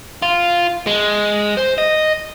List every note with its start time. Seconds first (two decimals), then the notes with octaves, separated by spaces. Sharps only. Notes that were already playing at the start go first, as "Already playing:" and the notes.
0.22 F4
0.87 G#3
1.57 C5
1.78 D#5